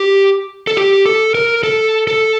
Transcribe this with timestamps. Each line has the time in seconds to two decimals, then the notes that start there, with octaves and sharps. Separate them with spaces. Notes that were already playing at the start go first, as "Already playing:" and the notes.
Already playing: G4
0.67 A4
0.77 G4
1.06 A4
1.35 A#4
1.63 A4
2.07 A4